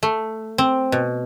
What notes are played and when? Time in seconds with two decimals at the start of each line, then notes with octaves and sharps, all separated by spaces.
0.03 A3
0.58 C4
0.92 B2